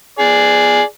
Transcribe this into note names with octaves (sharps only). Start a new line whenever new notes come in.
G#4 D5